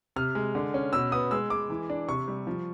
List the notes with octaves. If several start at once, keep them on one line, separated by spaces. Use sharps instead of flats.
C3 F6
G#3
D3
C#4
B2 E6
B3 D#6
G#3 E6
G#3 D6
E3
D4
C3 C#6
G3
F3